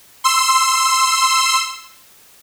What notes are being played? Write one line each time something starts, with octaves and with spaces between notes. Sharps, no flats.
C6 E6